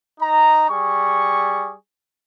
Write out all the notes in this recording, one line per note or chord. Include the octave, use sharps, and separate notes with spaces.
D#4 A#5
G3 G#4 C#6